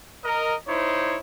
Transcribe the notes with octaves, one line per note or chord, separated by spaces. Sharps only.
A#4 D#5
D#4 E4 C5 C#5